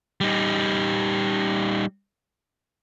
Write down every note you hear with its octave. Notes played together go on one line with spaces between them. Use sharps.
G3 D#4